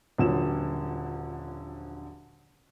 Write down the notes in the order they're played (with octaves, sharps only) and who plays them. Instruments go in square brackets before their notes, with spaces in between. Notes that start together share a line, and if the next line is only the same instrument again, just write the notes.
[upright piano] D#1 D3 F3 F#3 E7